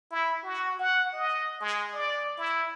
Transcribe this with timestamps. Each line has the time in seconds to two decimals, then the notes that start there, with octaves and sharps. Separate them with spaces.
0.11 E4
0.44 F#4
0.79 F#5
1.13 D#5
1.60 G#3
1.94 D5
2.38 E4